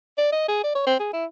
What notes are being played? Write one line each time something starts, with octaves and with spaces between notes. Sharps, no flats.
D5
D#5
G#4
D5
C#5
C4
G#4
E4